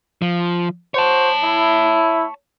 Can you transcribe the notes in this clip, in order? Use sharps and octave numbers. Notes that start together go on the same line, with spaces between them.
F3
F#4 C5 C#5 A5
E4